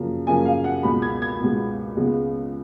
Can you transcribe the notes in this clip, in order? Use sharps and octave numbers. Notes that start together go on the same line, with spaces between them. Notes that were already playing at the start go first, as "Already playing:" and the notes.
Already playing: F#2 C#3 F3 A#3
F#2 C#3 F3 A#3 G#5
F5
F#5
C#2 B2 G#3 B3 B5
G#6
G#6
C#2 B2 G#3 B3
C#2 C#3 G#3 B3